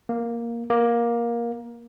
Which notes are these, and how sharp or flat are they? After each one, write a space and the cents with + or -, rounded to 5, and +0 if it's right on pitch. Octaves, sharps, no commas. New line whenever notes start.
A#3 +5
A#3 +15